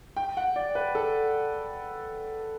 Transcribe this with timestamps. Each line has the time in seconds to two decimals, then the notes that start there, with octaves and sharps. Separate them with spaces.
0.16 G5
0.37 F#5
0.56 D5
0.75 B4
0.95 A4